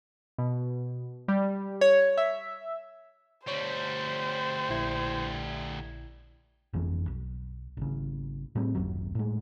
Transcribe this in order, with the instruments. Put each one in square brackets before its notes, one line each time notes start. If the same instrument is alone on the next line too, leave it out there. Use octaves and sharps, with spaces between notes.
[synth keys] B2
G3
C#5
E5
[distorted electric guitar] D2 G3 [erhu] C5 [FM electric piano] C#5
[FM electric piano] A#1 E4 G#6
[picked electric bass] G1 F2 E3
B1
G#1 C#3
A2 G3 C4
D1 G#1 F#2 F#3
A2 G#3